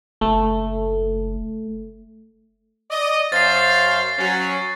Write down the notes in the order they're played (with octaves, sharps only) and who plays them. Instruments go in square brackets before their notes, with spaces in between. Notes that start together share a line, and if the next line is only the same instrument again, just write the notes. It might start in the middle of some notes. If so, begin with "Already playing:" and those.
[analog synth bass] F#1 [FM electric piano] A3
[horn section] D5 D#5
[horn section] F#2 C5 F5 [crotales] A6 C7
[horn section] F#3 C#4